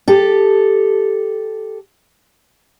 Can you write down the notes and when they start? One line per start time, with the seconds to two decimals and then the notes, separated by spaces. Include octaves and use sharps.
0.08 G4 A4